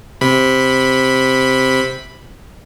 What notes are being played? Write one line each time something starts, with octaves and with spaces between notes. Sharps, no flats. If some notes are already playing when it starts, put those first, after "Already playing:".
C3 B5